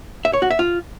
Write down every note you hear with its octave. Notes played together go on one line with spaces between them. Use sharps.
E5
C#5
F#4
E5
F4